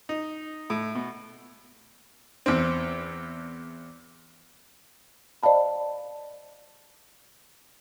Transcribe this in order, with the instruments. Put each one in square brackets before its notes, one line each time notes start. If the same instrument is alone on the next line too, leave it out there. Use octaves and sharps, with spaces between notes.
[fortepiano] D#4
A2
B2
E2 C4
[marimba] C5 D5 D#5 F5 A5 B5